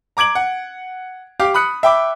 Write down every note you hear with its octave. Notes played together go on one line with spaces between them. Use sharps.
A#5 D6 G#6 D7 F#7
F#5
G4 F5 D6
B5 D#6 F#6 C#7
E5 G5 B5 D6